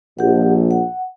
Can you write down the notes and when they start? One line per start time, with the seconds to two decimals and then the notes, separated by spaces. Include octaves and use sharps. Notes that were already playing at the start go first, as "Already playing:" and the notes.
0.19 A#1 G4 F#5
0.71 F#5